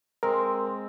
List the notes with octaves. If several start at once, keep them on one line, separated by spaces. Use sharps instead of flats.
G#3 C4 A#4